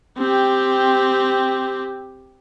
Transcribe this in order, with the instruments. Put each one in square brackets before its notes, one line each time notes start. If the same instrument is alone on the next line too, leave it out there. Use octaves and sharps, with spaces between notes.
[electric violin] C4 G4